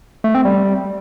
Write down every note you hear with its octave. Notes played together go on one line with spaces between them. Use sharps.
A3
C4
G3